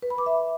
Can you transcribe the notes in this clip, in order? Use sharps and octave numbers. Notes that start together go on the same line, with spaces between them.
B4
B5
D6
E5